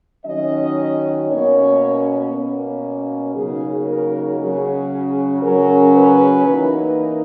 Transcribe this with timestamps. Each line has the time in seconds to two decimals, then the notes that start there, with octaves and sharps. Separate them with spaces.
0.25 D#3 F#3 C#4 D#5
1.29 B2 A#3 C#4 C#5
2.32 B2 A#3 C#4
3.35 C#3 F#3 A#3 D#4 G#4
3.87 A#4
4.38 C#3 F#3 C#4 G#4
5.42 C#3 F#3 C#4 A#4
5.94 B4
6.45 E3 A#3 D#4